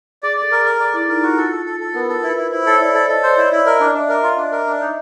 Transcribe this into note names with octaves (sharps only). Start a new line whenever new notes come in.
G#4 D5
D5
A4
A#4
G#4
A#4
D5
E4 D5
D#4 A#4
F4 F#4
F4 A4
A4
A4
A4
B3 A#4
A4
E4 B4
E4
E4 C5
A4 C#5
E4 D5
A4
A4 D#5
C5 D5
E4 C#5
E4 D5
A#4 D#5
D4
D4 E5
A#4
F4
D4
A#4
D4
D#4